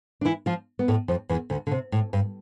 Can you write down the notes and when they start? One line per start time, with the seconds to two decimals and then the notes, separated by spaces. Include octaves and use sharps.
0.21 D4
0.25 E3 E4
0.46 F3 F4
0.79 B3
0.88 A2 A3
1.08 F2 F3
1.29 E2 E3
1.50 D2 D3
1.67 D3
1.71 C3
1.92 A2
2.13 G2